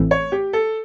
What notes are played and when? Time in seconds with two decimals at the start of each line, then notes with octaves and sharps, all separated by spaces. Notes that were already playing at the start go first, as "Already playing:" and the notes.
Already playing: A1 A2 E3 A3 C4
0.11 C#5
0.32 G4
0.53 A4